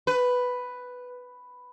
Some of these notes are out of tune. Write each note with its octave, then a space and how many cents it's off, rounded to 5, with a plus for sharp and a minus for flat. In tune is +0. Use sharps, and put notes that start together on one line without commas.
B4 +5